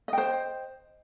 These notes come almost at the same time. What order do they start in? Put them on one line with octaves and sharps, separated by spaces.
D#5 G5 C5